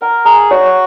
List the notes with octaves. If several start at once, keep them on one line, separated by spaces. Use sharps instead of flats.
A#4 F#5
G#4 A#5
F#4 C#5